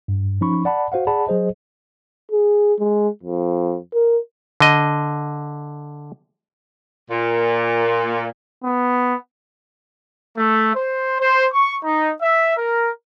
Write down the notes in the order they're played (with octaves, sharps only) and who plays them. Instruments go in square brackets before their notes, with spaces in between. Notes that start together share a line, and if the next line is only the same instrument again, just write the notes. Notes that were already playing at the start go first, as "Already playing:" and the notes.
[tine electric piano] G2
F3 C#4 D#4 B5 C#6
D5 F#5 A5 B5
F#4 C5 F5 F#5
G#4 D5 F#5 A5 B5
F#3 G#4 C5 D#5
[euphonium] G#4
G#3
F2
A#4
[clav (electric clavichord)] D3 D#5
[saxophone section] A#2
[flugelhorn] B3
[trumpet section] A3
C5
C5
C#6
D#4
E5
A#4